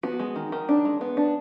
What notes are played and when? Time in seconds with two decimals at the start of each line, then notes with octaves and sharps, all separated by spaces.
0.03 B3 F#4
0.19 G#3
0.36 D#3
0.52 D#3
0.69 D4
0.85 G#3
1.01 B3
1.17 D4